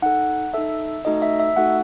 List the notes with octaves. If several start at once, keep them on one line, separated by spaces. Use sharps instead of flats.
D#4 A4 F#5
D#4 A4 E5
A3 D#4 F#4 A4 D#5
E5
E5
A3 D#4 F#4 A4 F#5